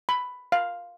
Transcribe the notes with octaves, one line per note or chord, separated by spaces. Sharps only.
B5
F5